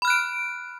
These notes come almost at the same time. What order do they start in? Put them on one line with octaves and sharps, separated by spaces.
B5 F6 F#6 D7